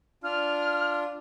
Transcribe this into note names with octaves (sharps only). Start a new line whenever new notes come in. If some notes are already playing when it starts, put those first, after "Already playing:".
D4 F4 F6